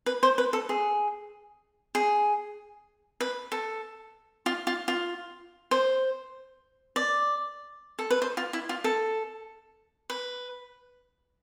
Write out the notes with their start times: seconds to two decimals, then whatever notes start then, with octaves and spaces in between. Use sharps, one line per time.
0.06 B4
0.23 C5
0.38 B4
0.53 A4
0.69 G#4
1.95 G#4
3.21 B4
3.52 A4
4.46 F4
4.67 F4
4.88 F4
5.71 C5
6.96 D5
7.99 A4
8.11 B4
8.22 C5
8.37 F4
8.53 E4
8.69 F4
8.84 A4
10.10 B4